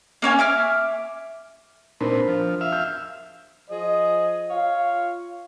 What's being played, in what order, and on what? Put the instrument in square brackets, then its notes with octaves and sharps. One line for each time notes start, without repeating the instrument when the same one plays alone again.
[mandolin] A#3 C#4 C#5 G#5
E5 D6 F6
[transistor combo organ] A#2 B3 C4 [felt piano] D4 A#4 C5
[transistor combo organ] F3
E5 F5
[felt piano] G6
[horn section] F3 G#4 C5 D#5
F4 C#5 F5